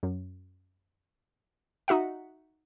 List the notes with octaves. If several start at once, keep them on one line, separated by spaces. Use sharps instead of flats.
F#2
D#4 F#4 E5 F#5